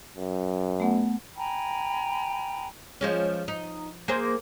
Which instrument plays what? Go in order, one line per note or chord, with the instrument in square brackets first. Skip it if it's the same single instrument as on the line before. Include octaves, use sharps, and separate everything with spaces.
[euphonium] F#2
[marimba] A3 B3 F#5
[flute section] G5 G#5 A#5 B5
[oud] F3 G#3 C#4
D#4
A#3 G#4 C5